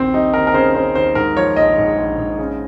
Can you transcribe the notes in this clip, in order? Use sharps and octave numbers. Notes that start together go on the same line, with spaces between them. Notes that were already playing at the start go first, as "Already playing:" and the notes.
Already playing: A#1 D#2 C4
G3 D#4
D#2 A#4
A#4
C#3 C5
C#3 C5
D#2 C5
G#2 A#4
F3 C#5
A#1 D#5
G#2
A#1
G#2
C#3